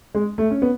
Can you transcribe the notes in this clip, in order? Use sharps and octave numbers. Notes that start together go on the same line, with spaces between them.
G#3
A3
C#4
B3